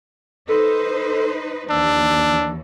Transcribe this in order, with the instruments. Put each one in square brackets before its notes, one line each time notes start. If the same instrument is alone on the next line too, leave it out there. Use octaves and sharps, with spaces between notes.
[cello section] D#4 B4 C5 [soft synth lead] A4
[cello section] D#2 E3 [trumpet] D4 [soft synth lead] E6